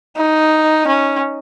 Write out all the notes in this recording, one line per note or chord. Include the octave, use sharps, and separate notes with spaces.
D#4
C#4